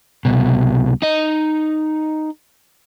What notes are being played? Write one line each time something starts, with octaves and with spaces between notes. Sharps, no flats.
C2 B2
D#4 D#5